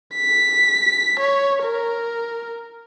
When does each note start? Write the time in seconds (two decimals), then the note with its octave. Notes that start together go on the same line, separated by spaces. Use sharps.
0.15 B6
1.19 C#5
1.63 A#4